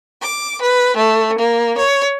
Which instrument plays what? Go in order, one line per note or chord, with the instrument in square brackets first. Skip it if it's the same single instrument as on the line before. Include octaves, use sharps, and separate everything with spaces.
[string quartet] D6
B4
A3
A#3
C#5